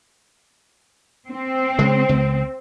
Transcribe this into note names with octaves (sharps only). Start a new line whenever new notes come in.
C4
C#3 G#3
C#2